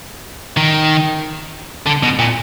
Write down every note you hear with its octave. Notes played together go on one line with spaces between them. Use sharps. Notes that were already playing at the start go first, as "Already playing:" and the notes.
D#3
D3
B2
A#2